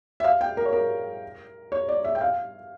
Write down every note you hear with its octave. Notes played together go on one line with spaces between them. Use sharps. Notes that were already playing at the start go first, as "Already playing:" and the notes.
E5
F5
G5
A#4
C#5
A#4
C#5
D5
E5
G5
F5